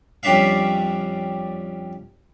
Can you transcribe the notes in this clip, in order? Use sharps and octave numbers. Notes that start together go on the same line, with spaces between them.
F2 G3 C#4 D4 E5 F5